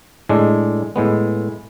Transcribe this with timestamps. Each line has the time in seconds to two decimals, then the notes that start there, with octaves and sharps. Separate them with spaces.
0.29 A2 G#3 D4
0.96 A2 G#3 B3